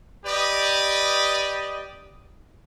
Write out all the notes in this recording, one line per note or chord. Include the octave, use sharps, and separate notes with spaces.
G4 B4 D5 D#5